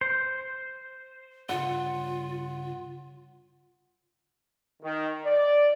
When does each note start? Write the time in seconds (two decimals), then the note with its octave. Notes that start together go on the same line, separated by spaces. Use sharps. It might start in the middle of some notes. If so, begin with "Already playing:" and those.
0.01 C5
1.49 G2 C#3 F4 F#5
4.83 D#3
5.26 D5